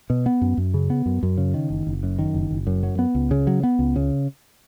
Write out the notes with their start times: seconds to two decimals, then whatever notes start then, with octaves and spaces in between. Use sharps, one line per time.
0.10 B2
0.26 B3
0.41 F#2
0.57 F#2
0.74 C#3
0.90 B3
1.06 F#2
1.23 F#2
1.38 C#3
1.54 D#3
1.70 F#1
1.87 F#1
2.03 F#2
2.19 D#3
2.34 F#1
2.51 F#1
2.67 F#2
2.83 F#3
2.99 B3
3.15 C#2
3.31 C#3
3.47 F#3
3.63 B3
3.79 C#2
3.96 C#3